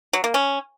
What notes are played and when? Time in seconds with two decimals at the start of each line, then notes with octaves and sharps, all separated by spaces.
0.13 F#3
0.24 A#3
0.34 C#4